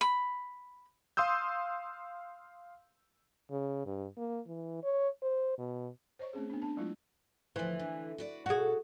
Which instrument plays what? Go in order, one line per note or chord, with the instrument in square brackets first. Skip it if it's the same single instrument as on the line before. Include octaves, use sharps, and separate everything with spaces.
[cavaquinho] B5
[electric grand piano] F5 C6 D#6 E6 G6
[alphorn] C#3
G2
A#3
E3
C#5
C5
B2
[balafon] C5 C#5 D#5 C#6
A3 C4 C#4 G#4
B3 D4
D4 A5
F#3 G#3 A3 E4 F4
[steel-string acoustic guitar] D2 F3 [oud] E3
[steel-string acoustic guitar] D3
F#4 B4 D5
[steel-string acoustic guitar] B2 A4 [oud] F#4 G#4